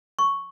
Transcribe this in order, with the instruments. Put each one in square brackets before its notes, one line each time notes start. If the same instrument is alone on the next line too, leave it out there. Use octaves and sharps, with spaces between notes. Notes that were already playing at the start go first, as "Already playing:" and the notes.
[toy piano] C#6